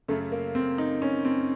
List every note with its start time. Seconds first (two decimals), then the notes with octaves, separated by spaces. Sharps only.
0.08 F#2 C#3 A3
0.32 A#3
0.55 C4
0.78 D#4
1.02 C#4
1.25 C4